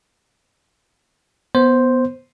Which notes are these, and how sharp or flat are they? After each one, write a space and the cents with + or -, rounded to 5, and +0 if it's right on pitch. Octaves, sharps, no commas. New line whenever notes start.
B3 +0 C5 +0